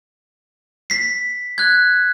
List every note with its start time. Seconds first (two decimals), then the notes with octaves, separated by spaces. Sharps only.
0.90 B6 C7
1.58 F#6 G#6